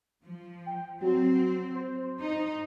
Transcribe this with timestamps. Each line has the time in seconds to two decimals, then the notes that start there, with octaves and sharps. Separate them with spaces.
0.24 F3
0.66 G5
1.01 F#3 C4
1.74 C5
2.22 D#4